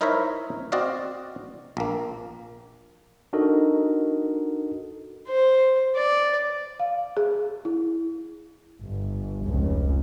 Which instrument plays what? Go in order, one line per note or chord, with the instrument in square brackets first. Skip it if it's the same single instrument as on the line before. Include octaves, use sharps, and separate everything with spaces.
[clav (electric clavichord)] D#4 E4 A#4 C5 C#5 E5
C4 F#4 D5 D#5 F5
A#1 A#3
[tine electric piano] D4 D#4 F#4 A4 A#4 D#5
[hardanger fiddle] C5
D5
[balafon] F5
G#4
E4
[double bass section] G1
F1 C#2